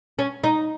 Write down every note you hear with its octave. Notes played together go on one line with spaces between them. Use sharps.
C#4
D#4